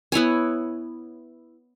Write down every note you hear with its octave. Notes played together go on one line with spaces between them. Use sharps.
B3 E4 C#5 G#5